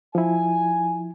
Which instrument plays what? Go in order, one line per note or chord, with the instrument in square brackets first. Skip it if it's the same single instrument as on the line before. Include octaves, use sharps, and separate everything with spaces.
[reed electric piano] F3 E4 [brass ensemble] G#5